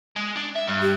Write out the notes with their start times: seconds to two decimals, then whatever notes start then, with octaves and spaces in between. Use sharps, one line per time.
0.16 G#3
0.36 D4
0.55 E5
0.67 G2
0.82 G4